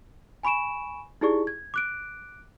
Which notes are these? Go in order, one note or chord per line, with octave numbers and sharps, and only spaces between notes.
G#5 B5 C#6 D7 E7
D#4 E4 G4 G#4 D5 C#6
G#6
D6 F#6 D7